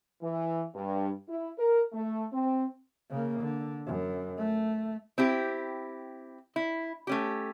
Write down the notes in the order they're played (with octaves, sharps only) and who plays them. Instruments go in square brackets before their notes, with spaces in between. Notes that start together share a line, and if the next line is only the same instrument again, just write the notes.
[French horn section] E3
G2
E4
A#4
A3
C4
[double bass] C#3 A#3
D3
F#2
A3
[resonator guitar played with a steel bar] C4 E4 G4
E4
A3 C#4 G4